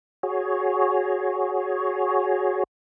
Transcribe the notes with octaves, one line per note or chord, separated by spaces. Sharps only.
F#4 G#4 C#5